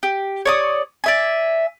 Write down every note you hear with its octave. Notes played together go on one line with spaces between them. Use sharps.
G4
C#5 D5 D#6
D5 E5 G#5